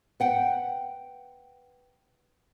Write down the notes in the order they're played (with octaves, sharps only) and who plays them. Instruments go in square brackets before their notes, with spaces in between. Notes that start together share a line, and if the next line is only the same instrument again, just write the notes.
[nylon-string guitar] B4 F#5 G5